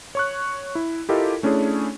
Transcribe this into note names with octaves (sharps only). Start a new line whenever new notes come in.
C#5 C#6 F#6
E4
E4 F4 G4 A4 A#4 D#5
A3 C#4 D4 E4 G#4 C#5